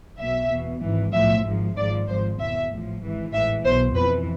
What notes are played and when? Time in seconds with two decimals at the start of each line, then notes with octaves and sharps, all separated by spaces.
0.19 B1 B2 E5
0.50 E2 B2
0.83 G#1 G#2 E3
1.14 B1 A2 F3 E5
1.45 G#1 G#2 F3
1.76 G#1 G#2 F3 D5
2.08 G#1 G#2 F3 C5
2.39 E2 B2 E5
2.70 A1 A2 F3
3.02 G#1 G#2 E3
3.33 A1 G#2 E3 E5
3.64 B1 B2 C5
3.95 F2 E3 B4